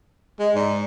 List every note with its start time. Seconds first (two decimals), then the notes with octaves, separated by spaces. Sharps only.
0.39 G#3 D#5
0.55 G#2 D5